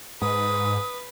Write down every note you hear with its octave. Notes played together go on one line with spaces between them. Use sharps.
G#2 B4 D#6